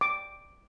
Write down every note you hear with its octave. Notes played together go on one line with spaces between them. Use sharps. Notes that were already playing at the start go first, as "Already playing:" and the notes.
D6